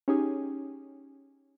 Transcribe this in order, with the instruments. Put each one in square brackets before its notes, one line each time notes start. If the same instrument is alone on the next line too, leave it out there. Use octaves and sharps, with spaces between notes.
[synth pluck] C#4 D#4 G4 G#4